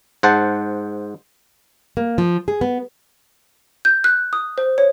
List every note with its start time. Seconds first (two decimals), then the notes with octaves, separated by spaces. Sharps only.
0.23 G#2 C5 F#5 A5
1.97 A#3
2.18 F3
2.48 G#4
2.61 B3
3.85 G6
4.04 F#6
4.33 D#6
4.58 C5
4.78 C#5